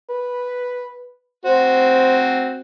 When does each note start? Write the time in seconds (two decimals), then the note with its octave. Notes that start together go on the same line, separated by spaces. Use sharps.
0.10 B4
1.45 C4 F#4 C5